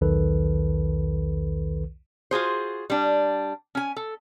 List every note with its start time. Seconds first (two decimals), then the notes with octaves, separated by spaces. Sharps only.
0.01 B1 E2 D#3 A4 B4
2.31 F4 F#4 G#4 C5
2.90 G3 D4
3.75 C#4 G#5
3.96 A4